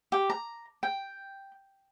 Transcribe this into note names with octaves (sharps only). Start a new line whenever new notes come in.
G4
A#5
G5